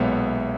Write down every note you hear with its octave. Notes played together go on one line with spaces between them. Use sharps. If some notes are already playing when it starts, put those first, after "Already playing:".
Already playing: B1 A#2 G#3 B3 C#5 E5